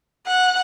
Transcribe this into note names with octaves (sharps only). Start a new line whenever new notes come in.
F#5